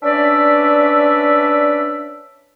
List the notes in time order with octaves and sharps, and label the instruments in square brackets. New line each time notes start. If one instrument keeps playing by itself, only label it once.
[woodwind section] C#4 D4 B4 D5 E5